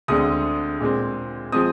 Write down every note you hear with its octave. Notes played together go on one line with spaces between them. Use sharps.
D2 D3 G#3 C4 D#6
A#2 G#3 C4
F3 G#3 C4 D#6